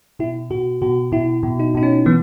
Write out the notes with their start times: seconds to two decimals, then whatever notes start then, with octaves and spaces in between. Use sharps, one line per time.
0.19 B2 E4
0.50 B2 F#4
0.82 B2 F#4
1.12 B2 E4
1.43 B2
1.60 D#4
1.75 B2 D#4
1.83 C#4
2.06 E3 B3